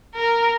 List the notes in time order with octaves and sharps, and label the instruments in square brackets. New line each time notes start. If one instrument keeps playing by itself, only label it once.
[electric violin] A#4